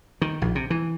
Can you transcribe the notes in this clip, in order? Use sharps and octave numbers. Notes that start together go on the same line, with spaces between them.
D#3
A#1
C3
E3